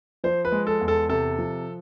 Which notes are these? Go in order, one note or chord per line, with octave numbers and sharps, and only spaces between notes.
F3 C5
B4
G#3
A4
E2
A4
C3 A4
F3